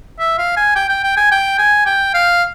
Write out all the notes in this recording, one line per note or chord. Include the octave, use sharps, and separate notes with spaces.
E5
F5
G#5
G5
G5
G5
G#5
G5
G#5
G5
F5